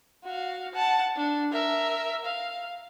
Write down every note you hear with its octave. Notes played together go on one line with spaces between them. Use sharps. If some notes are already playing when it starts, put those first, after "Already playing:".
F#4 F5
F#5 A5
D4
A#4 E5
F5